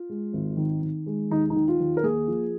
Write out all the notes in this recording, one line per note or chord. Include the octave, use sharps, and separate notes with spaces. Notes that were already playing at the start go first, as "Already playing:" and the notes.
Already playing: F4
G#3
G#1
D#3
D#3
G#3
D#2 D#4
D#4
D#3
F4
D#2
A#4
A#3 G#4
F3